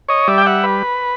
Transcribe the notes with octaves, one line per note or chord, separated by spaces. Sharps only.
C#5 D#5
G3 D5 E5
G5
E5 F#5
B4